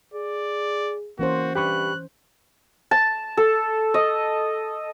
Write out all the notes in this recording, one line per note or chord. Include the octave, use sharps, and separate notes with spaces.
G#4 D5
E3 A#3 C#4 F#4 C5
G2 G4 B5 C#6 F#6
A5
A4
D#5